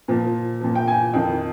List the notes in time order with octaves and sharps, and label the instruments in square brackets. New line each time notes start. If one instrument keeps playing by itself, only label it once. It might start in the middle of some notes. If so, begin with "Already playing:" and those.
[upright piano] A#2 F3
A#2 F3
G5
G#5
F2 D#3 G5